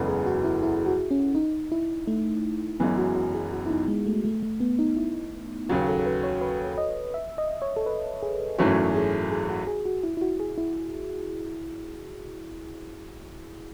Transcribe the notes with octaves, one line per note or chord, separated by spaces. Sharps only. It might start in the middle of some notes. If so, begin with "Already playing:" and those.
Already playing: F#1 E2 C#3 G#3 B3 A4
G#4
F#4
E4
E4
F#4
C#4
D#4
E4
A3
F#1 F#2 E3 G#3 B3
F#4
F#4
G#4
F#4
E4
D#4
G#3
A3
A3
A3
B3
D#4
E4
D#2 C#3 F#3 F#4
A4
A4
B4
C#5
B4
D#5
E5
D#5
C#5
A4
B4
G#4
G#1 F#2 E3 A3 C#4 F#4
G#4
G#4
F#4
G#4
F#4
E4
E4
F#4
G#4
E4